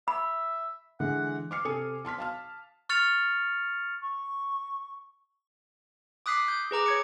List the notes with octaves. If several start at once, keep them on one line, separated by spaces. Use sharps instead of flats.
E5 B5
D3 E3 G#3 F#5
D6 F6 C7 C#7
C3 A4 G#5 D#6 C#7
A5 C6 F6 B6
F5 A5 F6
C#6 F6 A6 C#7 F7
C#6
D6 D#6 F#6 B6 C7
G6
G#4 B4 A#5 D6
C#5 G#6 C#7